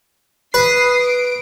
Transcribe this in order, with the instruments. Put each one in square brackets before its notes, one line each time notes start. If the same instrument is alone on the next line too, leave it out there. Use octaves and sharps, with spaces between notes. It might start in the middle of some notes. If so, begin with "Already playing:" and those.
[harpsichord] B4 [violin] D#6 C7
[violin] D7